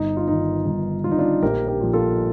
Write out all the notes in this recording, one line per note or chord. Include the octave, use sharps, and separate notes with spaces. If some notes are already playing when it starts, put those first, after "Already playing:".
Already playing: G1 D#4
F4
G2 D#3 D#4
G1 D#4
G2 D#3 D#4 F4
D4 F4
A#1 G4 A#4
G4 A#4
A#2 F3
F4 A4